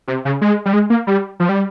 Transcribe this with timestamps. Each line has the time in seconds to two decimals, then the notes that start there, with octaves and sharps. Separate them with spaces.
0.08 C3
0.25 C#3
0.41 G#3
0.66 G3
0.73 G#3
0.90 A#3
1.07 G3
1.40 F3
1.49 G3